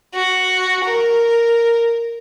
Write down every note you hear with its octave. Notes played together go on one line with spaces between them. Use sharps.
F#4
A#4